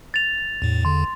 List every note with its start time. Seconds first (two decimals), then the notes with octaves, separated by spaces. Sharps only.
0.14 A6 F7
0.62 E2 A2
0.85 E2 D3 C6